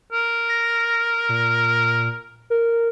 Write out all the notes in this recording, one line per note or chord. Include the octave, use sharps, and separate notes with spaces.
A#4
A#6
A#2
A#4